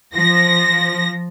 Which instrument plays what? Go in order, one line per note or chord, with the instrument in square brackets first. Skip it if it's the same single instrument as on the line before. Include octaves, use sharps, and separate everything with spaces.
[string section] F3 A#6